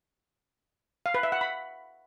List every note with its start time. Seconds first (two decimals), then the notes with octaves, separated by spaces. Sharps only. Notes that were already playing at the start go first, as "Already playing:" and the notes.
1.06 F5
1.14 B4
1.23 E5
1.32 F#5
1.41 B5